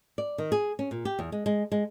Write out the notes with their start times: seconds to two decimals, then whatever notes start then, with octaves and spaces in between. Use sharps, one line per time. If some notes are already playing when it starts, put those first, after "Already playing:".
0.18 D5
0.38 D#3
0.52 G#4
0.79 C#4
0.91 A#2
1.05 G4
1.19 E2
1.32 G#3
1.46 G#3
1.72 G#3